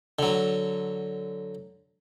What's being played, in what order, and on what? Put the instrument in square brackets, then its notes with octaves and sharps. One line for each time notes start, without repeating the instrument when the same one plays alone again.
[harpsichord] D3 F#3